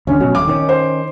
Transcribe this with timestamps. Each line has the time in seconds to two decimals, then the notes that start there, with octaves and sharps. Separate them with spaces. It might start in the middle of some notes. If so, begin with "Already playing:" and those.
0.07 D#1 D3 C#4
0.20 B2 F#3
0.35 D#1 D6
0.48 D#3 C4 C#4
0.69 C5